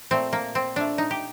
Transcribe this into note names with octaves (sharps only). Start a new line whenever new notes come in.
A#2 A3 C4
A#3
C4
A#2 A3 D4
D#4
G4